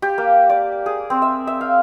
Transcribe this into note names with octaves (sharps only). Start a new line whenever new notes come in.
G4
A#3
D5
G#4
C4
E5
E5
F5